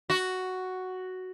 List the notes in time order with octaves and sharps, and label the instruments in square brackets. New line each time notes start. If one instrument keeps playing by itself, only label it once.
[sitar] F#4